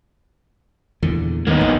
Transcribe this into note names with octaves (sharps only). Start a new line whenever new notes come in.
E2 A#2 D3
D#2 A2 A#3 B3 D#4
A#1